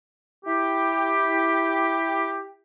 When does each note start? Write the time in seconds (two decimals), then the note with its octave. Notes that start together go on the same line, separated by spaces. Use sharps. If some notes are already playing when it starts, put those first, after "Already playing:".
0.45 E4 G4